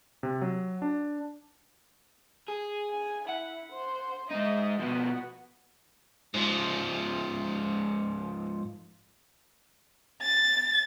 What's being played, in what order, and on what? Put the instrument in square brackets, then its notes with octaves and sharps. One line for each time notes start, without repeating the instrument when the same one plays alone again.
[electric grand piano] C3
F#3
D4
[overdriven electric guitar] G#4
[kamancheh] G#5
[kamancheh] E4 [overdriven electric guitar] F#5
[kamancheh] C5
[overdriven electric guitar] G#3 D#4 [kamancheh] D#5 E5
[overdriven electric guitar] B2 F3 [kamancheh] B3 F#4
[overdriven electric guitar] G#2 F3
[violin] A6